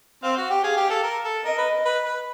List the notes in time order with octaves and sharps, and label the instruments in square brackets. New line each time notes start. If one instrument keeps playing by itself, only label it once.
[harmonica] C4 [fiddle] F5
[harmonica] F#4
G4
[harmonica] G#4 [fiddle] F5
[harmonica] G4
A4
A#4
A4
[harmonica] A#4 [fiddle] D#5
[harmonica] B4
B4
B4